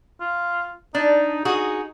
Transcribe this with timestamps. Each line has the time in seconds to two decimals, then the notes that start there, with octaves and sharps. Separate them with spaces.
0.21 F4
0.95 D4 D#4
1.45 D#4 F#4 G#4